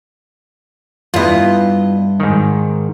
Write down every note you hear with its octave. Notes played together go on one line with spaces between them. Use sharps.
G2 B3 E4 F4 D#5
G#2 D#3